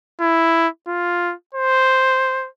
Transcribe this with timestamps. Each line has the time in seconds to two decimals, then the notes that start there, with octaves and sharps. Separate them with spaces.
0.21 E4
0.88 F4
1.54 C5